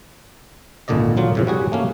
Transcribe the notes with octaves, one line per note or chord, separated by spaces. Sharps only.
G#1 C#2 A#2 D3 D5 D#5
A#2 F#3 F4
F2 A2 C#3
G3 F#4 G#4 F#5
A3 A#3 C#4